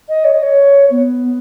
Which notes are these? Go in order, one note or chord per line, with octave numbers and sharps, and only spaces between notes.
D#5
C#5
D#5
C#5
B3